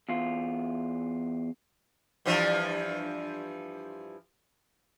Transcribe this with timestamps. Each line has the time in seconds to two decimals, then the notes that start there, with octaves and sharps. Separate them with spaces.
0.09 E2 F4
2.26 G2 E3 F3